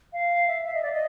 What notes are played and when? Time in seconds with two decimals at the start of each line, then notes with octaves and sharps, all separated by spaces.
0.13 F5
0.48 E5
0.66 E5
0.74 D#5
0.82 D5
0.92 D#5